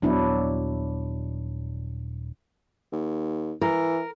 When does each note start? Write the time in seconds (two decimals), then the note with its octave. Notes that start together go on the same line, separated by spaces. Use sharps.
0.02 D#1 F#3 B3 D4 E4
2.92 D#2
3.61 E3 A#4